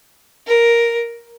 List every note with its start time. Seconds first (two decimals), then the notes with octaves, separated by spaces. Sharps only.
0.47 A#4